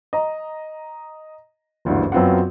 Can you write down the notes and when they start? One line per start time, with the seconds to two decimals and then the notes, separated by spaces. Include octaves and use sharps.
0.13 D#5 A#5
1.85 F#1 D2 G2 D3 E3
2.12 F#2 F#3 B3 C4 F4 F#5